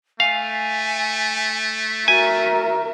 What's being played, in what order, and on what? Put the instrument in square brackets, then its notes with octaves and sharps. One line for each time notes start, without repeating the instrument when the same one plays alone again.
[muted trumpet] A3 [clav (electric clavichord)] F5 [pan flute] G#5
[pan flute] F#4 [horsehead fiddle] A#4 E5 [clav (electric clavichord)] G#5